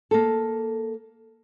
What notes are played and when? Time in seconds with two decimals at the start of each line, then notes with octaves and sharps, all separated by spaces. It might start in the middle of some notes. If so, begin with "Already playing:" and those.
0.11 A#3 A4